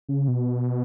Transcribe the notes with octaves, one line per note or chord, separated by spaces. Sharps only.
C#3
B2